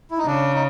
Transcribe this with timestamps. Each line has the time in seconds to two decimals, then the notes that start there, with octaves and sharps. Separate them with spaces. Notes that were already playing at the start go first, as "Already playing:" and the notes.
0.11 E4
0.18 D#4
0.26 C#3 D4
0.54 D#4